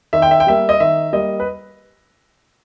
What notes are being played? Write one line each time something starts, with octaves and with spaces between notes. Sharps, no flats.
D#3 E5
G5
E5
G5
G3 A#3 E5
D#5
D#3 E5
G3 A#3 D#5
B4